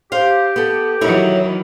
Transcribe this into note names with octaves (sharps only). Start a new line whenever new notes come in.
G4 C5 F5
B3 A4
D#3 E3 F#3 E4 A#4 C#5